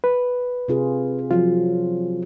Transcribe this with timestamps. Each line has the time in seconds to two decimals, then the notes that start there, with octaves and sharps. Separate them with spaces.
0.04 B4
0.68 C3 F4 G#4
1.31 F3 F#3 F4